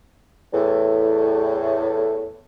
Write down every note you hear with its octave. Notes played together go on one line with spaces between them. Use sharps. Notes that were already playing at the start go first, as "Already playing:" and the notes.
E2 A2